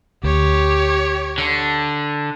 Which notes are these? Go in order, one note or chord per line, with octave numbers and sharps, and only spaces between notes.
D2 G4 C#5
D3